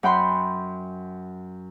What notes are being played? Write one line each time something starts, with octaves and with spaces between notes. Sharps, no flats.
F#2 F#5 G5 B5 C6